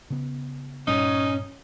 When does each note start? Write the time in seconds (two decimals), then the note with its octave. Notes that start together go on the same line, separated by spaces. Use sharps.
0.10 C#3 B3
0.87 G2 A#2 G3 C#4 D#4